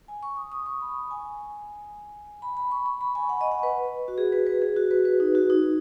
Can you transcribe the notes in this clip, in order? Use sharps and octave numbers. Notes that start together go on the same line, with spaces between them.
G#5
C#6
D#6
D#6
C#6
B5
G#5
B5
B5
C#6
C#6
B5
G#5
F#5
D#5
F#5
B4
F#4
G#4
B4
B4
G#4
F#4
B4
B4
D#4
F#4
D#4